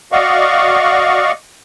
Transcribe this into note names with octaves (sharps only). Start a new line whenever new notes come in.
F#4 D5 D#5 F5 F#5 C#6